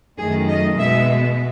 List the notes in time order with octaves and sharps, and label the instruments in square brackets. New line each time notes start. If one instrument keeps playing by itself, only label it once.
[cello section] F#2 D#3 A3 G#4
D#5
B2 G#3 B3 E5